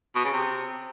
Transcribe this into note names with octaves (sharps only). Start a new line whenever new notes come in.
B2
C#3
C3